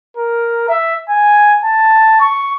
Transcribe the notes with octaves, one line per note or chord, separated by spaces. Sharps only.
A#4
E5
G#5
A5
C#6